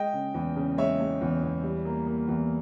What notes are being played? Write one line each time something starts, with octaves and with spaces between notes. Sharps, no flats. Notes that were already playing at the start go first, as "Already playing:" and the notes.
Already playing: G#3 D#5 G5
C#3
E2
C#3
G#3 C#5 E5
G#3
E2
E2
G3
A#3
A#3
E2